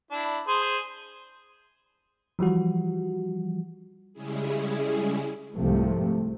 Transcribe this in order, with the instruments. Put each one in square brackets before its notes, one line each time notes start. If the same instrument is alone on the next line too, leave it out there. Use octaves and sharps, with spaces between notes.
[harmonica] D4 E4
G#4 C5
[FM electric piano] E3 F3 G3 F#4
[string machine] C#3 G3 G#3 C#4 E4 G#4
[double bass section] C2 G#2 C3 F3 A3